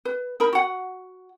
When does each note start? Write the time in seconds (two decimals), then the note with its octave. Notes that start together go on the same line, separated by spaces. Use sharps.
0.05 B4
0.40 D#4 A#4 B5
0.53 F#4 F#5